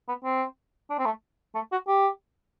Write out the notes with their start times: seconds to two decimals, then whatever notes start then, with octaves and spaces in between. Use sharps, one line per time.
0.08 B3
0.24 C4
0.90 D4
0.98 C4
1.06 A3
1.55 A3
1.72 F#4
1.88 G4